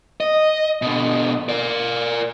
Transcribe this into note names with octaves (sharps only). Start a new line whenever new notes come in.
D#5
B2 D3
A#4 D5